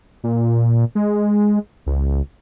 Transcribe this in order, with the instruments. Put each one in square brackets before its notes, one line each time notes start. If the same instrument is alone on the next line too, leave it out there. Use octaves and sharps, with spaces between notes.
[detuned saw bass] A#2
G#3
C#2